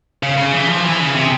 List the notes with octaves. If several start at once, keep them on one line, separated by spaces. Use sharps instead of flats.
C#3
C#3
E3
F3
E3
C#3
C3